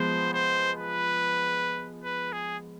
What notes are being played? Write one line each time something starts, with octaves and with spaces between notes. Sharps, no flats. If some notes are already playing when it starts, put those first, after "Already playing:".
Already playing: F3 G#3 B3 C5
C5
B4
B4
G#4